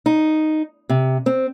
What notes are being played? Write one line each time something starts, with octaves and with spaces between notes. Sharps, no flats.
D#4
C3
C4